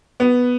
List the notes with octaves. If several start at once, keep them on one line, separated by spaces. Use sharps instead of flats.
B3